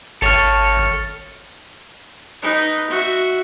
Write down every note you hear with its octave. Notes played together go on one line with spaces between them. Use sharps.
G#1 A4 C#5 F6
D#4 B4
F#4 E5